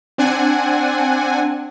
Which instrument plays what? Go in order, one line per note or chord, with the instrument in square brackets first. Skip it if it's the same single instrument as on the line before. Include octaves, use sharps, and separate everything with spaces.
[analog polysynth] C4 D4 F#5 G#5